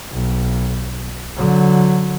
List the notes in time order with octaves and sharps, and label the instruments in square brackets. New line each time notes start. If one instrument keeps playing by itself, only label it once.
[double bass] B1
D3 F#3